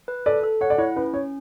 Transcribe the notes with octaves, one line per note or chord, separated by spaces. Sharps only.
B4
A4 D5
A4
C#5 F#5
D5
E4 C#5
C#4 B4
C#4 C#5